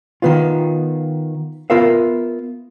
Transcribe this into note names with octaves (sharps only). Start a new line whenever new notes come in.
D#3 B3 F4
B3 F4 A#4 E5 F5